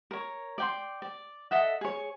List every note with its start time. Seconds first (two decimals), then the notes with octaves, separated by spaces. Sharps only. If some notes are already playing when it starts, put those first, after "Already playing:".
0.11 A#4 C#5
0.58 D5 G5 C6
1.02 D5
1.51 A4 D#5 E5 F#5
1.81 G#4 C#5